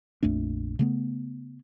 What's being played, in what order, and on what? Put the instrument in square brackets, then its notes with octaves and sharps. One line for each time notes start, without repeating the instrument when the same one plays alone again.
[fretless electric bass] A#1 F2 A3 D4
C#3 A3 B3